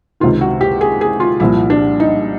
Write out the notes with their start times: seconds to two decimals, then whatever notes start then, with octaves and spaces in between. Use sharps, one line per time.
0.20 C#2 C3 D#3 F4
0.41 F#4
0.61 G4
0.81 G#4
1.01 G#4
1.20 F4
1.40 C2 A#2 F3 E4
1.70 D4
2.00 D#4